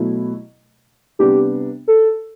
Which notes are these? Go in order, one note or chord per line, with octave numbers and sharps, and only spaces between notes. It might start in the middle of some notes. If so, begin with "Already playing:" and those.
Already playing: B2 F#3 A3 E4
C3 G3 B3 D4 G4
A4